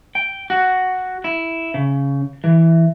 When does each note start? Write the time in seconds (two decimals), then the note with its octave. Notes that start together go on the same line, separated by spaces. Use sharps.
0.15 G5
0.50 F#4
1.24 E4
1.74 C#3
2.44 E3